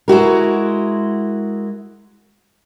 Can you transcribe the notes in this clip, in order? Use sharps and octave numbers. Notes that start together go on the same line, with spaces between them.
G#3 E4 F#4 A#4